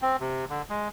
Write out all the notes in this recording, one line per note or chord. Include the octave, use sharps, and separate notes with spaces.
C4
C3
D3
G#3